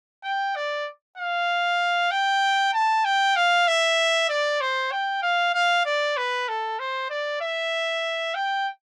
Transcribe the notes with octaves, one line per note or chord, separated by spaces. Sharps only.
G5
D5
F5
G5
A5
G5
F5
E5
D5
C5
G5
F5
F5
D5
B4
A4
C5
D5
E5
G5